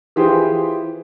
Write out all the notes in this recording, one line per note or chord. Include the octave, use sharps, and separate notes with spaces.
E3 F4 G4 G#4 B4 C5